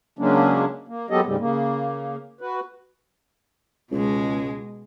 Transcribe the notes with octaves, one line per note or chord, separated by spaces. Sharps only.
C#3 F#3 G#3 A#3 C#4 D4
A#3
F#3 G#3 B3 G4 A4 D#5
D2 G#2 C#3 G3
C#3 A#3
F#4 B4
C#2 B2 G#3